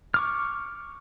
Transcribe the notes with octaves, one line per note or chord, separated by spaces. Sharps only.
C#6 D6 F6